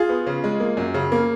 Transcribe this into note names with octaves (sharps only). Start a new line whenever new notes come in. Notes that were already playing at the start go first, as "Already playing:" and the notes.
Already playing: F4 G#4
B3
C#3
G#3
A#3
F#2
C#3
A#3